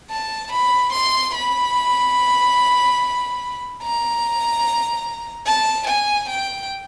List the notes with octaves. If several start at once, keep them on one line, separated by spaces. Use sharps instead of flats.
A5
B5
C6
B5
A#5
A5
G#5
G5